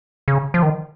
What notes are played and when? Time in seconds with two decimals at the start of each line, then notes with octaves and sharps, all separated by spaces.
0.28 C#3
0.54 F3
0.63 D#3